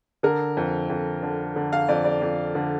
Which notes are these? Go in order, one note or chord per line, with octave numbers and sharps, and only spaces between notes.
D3 A#4
F2
F2
D3
D3
F5
F2 D5
D5
F2
D3